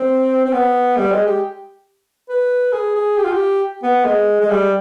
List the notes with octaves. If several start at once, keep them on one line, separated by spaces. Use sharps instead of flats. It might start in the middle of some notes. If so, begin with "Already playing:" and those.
Already playing: C4
C4
B3
G3
G#3
G4
B4
G#4
G#4
G4
F4
G4
B3
G#3
G#3
G3